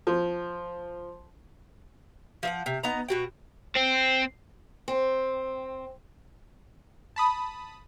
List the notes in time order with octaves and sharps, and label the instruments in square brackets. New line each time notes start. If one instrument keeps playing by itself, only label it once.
[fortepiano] F3
[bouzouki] F3 E5 F#5
C3
B3 D#4 A#5
B2 F#4 G5
[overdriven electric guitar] C4
[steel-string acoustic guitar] C4
[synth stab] A5 B5 D#6